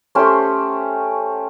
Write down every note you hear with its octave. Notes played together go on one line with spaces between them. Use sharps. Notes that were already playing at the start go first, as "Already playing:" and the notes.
A3 C#4 G4 C5